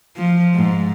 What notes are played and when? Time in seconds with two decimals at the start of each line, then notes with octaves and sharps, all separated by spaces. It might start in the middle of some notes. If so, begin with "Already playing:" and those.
0.17 F3
0.55 G#2